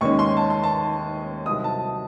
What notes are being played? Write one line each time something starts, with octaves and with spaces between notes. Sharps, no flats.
D#2 D#3 G#3 C#4 C#6
C6
A5
C6
A5
C2 C3 F#3 C4 D#4 D#6
A5